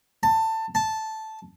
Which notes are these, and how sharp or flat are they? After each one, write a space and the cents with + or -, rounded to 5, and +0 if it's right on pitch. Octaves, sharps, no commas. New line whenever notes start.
A5 +20
A5 -5